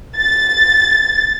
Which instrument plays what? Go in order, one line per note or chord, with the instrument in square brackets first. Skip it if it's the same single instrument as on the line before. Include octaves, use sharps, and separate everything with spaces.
[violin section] A6